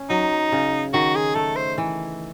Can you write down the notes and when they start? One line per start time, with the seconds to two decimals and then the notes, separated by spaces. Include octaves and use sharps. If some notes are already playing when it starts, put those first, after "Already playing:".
Already playing: C#4
0.10 F#3 D#4
0.52 C#3
0.93 D#3 F#4
1.15 G#4
1.35 A3 A4
1.56 C5
1.78 E3